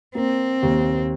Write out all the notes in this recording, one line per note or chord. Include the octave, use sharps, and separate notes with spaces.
A#3 C4
D#2